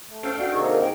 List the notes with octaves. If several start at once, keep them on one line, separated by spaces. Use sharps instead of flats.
A3
C#4 A4 F5 G5
D4 F#4 F#5
C3 D#3 A#3 D#4 G#4 A4 C#6
A#4
D#4 G#4 G5